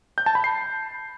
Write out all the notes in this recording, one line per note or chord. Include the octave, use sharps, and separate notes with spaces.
G6
A5
B5
C7